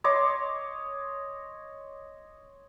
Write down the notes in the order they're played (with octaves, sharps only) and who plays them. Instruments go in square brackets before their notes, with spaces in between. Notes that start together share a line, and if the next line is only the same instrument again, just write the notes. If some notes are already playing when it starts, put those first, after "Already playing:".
[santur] C#5 D#5 C6 D6